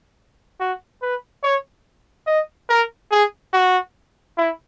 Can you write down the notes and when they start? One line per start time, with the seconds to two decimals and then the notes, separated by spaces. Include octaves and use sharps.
0.60 F#4
1.02 B4
1.43 C#5
2.27 D#5
2.69 A#4
3.11 G#4
3.53 F#4
4.37 E4